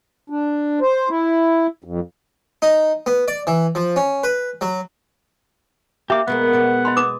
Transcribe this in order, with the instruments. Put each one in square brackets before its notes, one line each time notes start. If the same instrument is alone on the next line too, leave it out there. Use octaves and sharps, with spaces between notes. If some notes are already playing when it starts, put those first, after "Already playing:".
[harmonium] D4
C5
E4
F2
[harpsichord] D#4
B3
D5
E3
F3
C#4
B4
F#3
[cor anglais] A#3 [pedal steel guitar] G4 D6 [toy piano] E5
[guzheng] B2 G#3 A#3 [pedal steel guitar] B3 [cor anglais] F#5
[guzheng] B2 D5
[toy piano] D#5 B5 C6
[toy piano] B4 D6 D#6 [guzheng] G#5